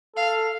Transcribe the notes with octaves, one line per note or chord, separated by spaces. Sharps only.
A4 F5